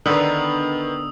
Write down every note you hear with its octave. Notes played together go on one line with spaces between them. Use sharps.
D3 D#3 B3 D4 D#4 B4 D#6 E6